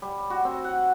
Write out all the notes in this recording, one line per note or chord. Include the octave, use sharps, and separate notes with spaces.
G3
F#4
C4
F#5